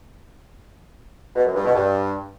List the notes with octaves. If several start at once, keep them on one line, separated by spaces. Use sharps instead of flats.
B2
F#2
G2
B2
G2